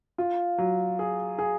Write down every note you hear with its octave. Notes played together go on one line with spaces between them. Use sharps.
F4
F#3
G#4
G#4